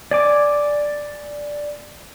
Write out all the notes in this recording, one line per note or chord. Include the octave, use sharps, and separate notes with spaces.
D5 G#5 D6